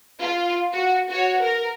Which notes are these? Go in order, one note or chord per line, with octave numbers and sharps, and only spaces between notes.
F4
F#4
F#4 C#5
A#4